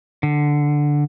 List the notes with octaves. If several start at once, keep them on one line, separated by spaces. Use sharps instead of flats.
D3